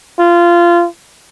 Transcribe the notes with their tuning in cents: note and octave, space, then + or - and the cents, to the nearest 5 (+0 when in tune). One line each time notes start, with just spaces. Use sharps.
F4 -20